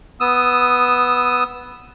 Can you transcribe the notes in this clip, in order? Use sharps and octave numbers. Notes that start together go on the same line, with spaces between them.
B3 D#6 E6